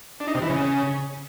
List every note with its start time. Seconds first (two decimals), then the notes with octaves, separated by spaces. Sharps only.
0.20 D4
0.28 D#4
0.35 C3
0.42 E3
0.49 C#3